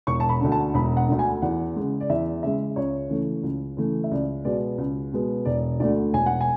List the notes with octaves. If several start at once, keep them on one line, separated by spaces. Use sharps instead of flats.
E1 C#6
A5
B5
D2 D3
A5
E1 B5
F#5
D2 D3
G#5
E2 F#5
C#3 G#3
D5
E2 E5
C#3 G#3 E5
C#2 C#5
C#3 E3 A3
C#2
C#3 E3 A3
E5
C#2 D5
B2 G#3 B3 D5
C#2
B2 G#3 B3
E1 D5
D2 D3 A3 D5
E1 G#5
F#5
G#5